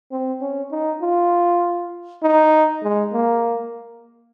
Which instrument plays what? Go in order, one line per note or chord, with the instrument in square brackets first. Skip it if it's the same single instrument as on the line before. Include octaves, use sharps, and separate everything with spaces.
[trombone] C4
C#4
D#4
F4
D#4
G#3
A#3